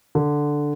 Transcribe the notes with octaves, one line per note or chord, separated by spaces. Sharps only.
D3